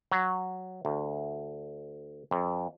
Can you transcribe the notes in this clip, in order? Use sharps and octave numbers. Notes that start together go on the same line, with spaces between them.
F#3
D2
F2